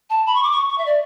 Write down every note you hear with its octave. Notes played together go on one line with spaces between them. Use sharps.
A5
B5
C#6
D6
C#6
C#6
E5
D5